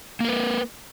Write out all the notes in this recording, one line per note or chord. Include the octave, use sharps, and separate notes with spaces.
A#3 A#4 B4